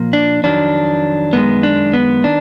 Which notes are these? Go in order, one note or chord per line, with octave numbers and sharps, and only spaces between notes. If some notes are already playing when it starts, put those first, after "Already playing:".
Already playing: A#2 F3 A#3
D4
F2 D#3 F#3 D4
F#2 D#3 G#3 B3
D4
B3
D#3 D4